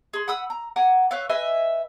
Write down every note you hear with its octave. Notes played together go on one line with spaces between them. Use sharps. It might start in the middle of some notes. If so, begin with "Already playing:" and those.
G#4 C6
F#5 B5 D#6 E6
A#5
F#5 G#5 A#5 D6
B4 C#5 E5 F5
B4 D#5 E5 G#5